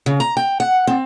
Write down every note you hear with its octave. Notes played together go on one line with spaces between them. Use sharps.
C#3
A#5
G5
F#5
C4